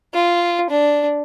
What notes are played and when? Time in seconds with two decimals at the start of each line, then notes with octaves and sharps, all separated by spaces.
0.14 F4
0.70 D4